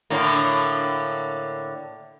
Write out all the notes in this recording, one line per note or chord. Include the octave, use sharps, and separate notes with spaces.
A2 D3 A#3